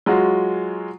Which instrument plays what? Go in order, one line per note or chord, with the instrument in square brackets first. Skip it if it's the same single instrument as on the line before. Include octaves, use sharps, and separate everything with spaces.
[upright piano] F#3 G#3 F4 F#4